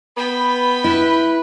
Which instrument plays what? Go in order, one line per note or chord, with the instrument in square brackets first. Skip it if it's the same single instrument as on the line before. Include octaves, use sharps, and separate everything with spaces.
[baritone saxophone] B3 [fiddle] G5 B5
[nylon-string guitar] E4 [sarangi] B4